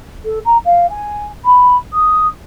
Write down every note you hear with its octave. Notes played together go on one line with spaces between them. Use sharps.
A4
A#5
F5
G#5
B5
D#6